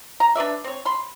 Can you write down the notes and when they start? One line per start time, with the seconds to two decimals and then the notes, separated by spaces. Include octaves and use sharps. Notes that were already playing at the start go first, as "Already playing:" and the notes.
0.20 A#5
0.36 D4 B4 D5 E5
0.64 C4 C#5
0.85 B5 C6